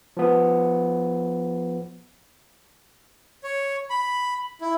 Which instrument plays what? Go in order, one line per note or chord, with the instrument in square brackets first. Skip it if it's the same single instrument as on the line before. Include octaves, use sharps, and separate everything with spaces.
[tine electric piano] F3 B3
[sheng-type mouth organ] C#5
B5
E4